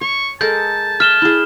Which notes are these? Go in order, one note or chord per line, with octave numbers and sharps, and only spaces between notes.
C#5 C#6
G#3 A4 A#4 A5 G6
E5 F6 E7 G7
E4 G#4